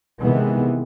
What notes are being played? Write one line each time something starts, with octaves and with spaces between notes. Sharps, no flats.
C3 D#3 E3 G#3 B3